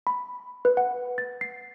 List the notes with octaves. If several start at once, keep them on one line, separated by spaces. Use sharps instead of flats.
B5
B4
F#5
A6
C7